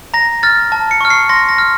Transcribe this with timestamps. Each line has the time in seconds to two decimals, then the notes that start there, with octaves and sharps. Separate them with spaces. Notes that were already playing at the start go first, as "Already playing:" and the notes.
0.14 A#5 A#6
0.43 F6 A6
0.72 A5
0.91 C#7
1.01 C#6 F6
1.10 C7
1.29 C6 A#6
1.49 A#6
1.58 F6